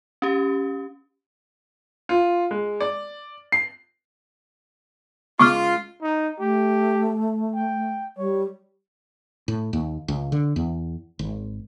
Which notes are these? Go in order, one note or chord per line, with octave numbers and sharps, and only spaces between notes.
C#4 G4
F4
G#3
D5
C7
C#2 F4 C#6 D6 F6
D#4
A3 G4
G5
G3 C#5
A2
D#2
C#2
D3
E2
G#1